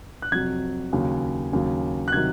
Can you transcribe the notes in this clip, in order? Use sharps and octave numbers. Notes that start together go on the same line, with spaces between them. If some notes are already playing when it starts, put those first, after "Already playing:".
F#6
F2 C3 F#3 G#6
D#2 C#3 F#3
D#2 C#3 F#3
F#6
C3 D#3 F#3 G#6